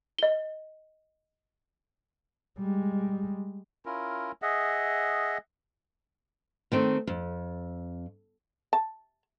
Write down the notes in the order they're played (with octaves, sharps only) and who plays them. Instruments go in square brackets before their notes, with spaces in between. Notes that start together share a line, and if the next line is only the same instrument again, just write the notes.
[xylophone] D#5 G7
[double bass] G3 G#3
[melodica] C#4 E4 F4 A#4
G#4 D#5 E5 F#5
[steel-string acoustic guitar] D#3 A3 C4 D#4
F2
[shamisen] A5